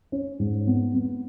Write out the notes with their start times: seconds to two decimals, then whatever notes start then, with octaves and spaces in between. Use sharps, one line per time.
0.12 C#4
0.39 G#2
0.67 B3
0.95 B3